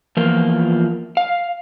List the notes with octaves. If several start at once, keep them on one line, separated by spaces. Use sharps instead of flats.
E2 F3 A#3 F4
F5